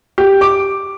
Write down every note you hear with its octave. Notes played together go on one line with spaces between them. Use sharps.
G4
D6